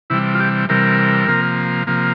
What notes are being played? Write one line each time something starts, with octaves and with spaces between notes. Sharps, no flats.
C3 E3 G3 E4
F4
G4
C3 E3 G3 A#4
C3 F3 A#3
C3 F3 A#3